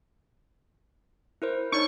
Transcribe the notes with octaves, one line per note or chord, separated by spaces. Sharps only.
E4 A#4 C5
D4 D#4 C#5 C#6